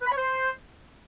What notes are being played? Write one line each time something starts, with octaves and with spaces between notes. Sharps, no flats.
B4
B5
C#5
C5